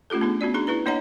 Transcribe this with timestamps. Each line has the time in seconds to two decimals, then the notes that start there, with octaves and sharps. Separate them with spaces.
0.10 A3 C#4 F4 G4 A4
0.21 B3 D4 G#4
0.41 B3 C#4 F#4 D5
0.54 D4 D#4 G#4 A#5
0.67 D#4 E4 G#4 B4 A#5
0.86 A#3 D4 C#5 D#5 F#5 A#5